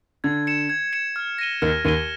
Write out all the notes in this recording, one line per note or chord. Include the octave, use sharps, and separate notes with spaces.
D3 G#6
C#7 E7
G#6
C#7 E7
F6
A#6 D#7 G7
D#2 D#3 F6
D#2 D#3 A#6 D#7 G7